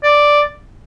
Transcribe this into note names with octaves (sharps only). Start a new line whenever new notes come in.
D5